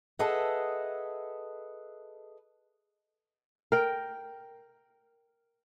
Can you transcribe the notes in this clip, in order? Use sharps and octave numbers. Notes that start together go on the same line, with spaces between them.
G#4 A4 B4 D#5 E5 F#5
A#4 G5